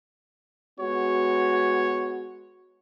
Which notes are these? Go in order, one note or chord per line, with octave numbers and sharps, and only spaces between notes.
G#3 B3 F#4 C#5